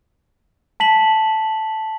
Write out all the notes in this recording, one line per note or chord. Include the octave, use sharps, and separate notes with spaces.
A5 B6 F#7